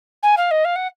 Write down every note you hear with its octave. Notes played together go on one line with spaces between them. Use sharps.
G#5
F5
D#5
F5
F#5